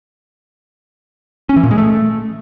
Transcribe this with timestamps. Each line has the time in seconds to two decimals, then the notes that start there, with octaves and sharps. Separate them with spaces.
1.49 C#4
1.56 E3
1.64 A#2
1.71 G#3
1.78 A3